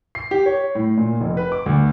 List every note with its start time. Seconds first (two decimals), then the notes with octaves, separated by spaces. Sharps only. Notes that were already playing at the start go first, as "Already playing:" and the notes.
0.15 C7
0.31 G4
0.46 C#5
0.75 A2
0.98 A#2
1.21 F1
1.37 B4
1.52 D6
1.66 D2